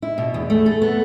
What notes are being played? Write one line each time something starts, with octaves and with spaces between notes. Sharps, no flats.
E4
B2
E2
A3
A4
B3